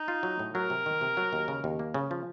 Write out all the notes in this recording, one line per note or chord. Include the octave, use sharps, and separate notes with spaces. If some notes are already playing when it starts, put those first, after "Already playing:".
Already playing: D#4
F4
F#3
A2
F#3 A#4
C3
D#3
C3
F#3
D#2
C#3
D#2
A#3
C#3
F3